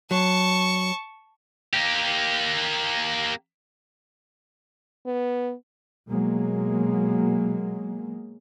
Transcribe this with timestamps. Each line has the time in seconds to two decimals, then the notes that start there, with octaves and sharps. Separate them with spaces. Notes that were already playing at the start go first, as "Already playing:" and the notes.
0.11 F#3 A5 C#6
1.74 A#3 G4
5.06 B3
6.09 B2 F#3 G#3 A#3